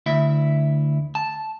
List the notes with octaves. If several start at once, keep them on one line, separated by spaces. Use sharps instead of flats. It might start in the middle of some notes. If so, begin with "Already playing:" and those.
D2 E4 E5
A5